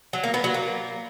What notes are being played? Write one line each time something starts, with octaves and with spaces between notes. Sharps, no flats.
F#3
A#3
B3
F#3
A#3